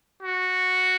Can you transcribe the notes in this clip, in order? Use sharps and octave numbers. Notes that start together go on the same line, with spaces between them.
F#4